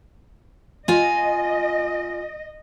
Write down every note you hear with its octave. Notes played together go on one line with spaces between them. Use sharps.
F4 D#5 G#5